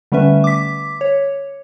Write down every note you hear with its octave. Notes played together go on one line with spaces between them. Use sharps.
D3 G3 A3 C#4 B4 E5
D6 B6
C#5